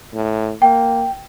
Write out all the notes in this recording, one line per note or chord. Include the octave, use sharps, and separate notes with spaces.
A2
A#3 G5